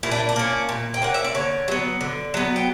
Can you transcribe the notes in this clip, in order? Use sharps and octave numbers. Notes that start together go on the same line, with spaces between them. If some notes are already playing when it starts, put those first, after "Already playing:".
A#2 E4
D4
D4
A#3 C#4
A#2
G5
A#3 C#4 F#5
E5
D5
D3 C#5
F#3 B3
D3
F#3 B3
G5